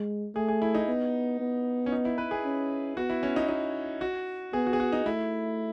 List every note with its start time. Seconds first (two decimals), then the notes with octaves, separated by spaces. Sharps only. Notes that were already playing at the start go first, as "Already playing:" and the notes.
Already playing: G#3
0.35 A3 G#4
0.48 G#4
0.62 E4
0.75 D#4
0.88 B3
1.40 B3
1.86 C#4
1.92 D#4
2.05 E4
2.18 B4
2.31 G#4
2.45 C#4
2.96 B3 F#4
3.10 E4
3.23 C#4
3.36 D#4
3.48 D#4
4.01 F#4
4.53 B3 G#4
4.67 F#4
4.73 G#4
4.80 F#4
4.93 D#4
5.06 A3 E4